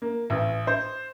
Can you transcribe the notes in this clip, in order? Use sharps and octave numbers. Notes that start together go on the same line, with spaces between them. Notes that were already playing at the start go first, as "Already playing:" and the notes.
A#3
A1
C5